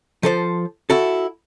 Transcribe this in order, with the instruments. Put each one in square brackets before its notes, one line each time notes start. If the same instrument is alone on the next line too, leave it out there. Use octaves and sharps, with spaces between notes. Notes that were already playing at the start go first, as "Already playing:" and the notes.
[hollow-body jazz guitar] F3 A4 C5
E4 F#4 A4